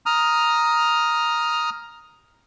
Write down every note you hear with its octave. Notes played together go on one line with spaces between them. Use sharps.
A#5 D#6 F6